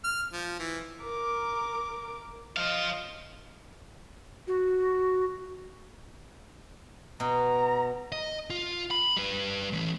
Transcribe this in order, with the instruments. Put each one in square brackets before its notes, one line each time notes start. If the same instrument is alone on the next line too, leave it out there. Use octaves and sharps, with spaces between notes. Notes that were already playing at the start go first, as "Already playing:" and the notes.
[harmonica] F6
F3
E3
[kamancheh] A#4 D6
[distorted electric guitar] F3 F5 [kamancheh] D#5
[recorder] F#4
[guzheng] B2 [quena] A#5
[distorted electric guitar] D#5
F4
B5
G3 B4
E3 A3